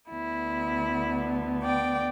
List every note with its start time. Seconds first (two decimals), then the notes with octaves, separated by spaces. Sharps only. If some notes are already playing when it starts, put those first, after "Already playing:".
0.10 D2 D3 B3 E4
1.62 D5 G5